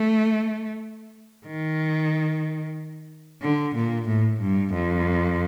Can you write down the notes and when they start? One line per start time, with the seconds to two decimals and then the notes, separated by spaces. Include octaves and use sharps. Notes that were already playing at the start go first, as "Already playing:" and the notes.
Already playing: A3
1.46 D#3
3.42 D3
3.75 A#2
4.07 A2
4.40 G2
4.73 F2